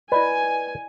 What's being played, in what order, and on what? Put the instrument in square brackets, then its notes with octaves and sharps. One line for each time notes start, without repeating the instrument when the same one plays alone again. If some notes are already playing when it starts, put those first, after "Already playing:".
[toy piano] E4 D5 D#5 [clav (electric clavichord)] B4 [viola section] G#5